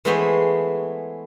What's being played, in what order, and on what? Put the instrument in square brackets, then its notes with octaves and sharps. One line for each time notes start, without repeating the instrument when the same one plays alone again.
[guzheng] E3 G#3 A3 B3 C5 C#5